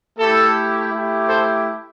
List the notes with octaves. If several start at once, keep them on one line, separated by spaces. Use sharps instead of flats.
A3 E4 G4 A4
A3 E4 G4
A4 C5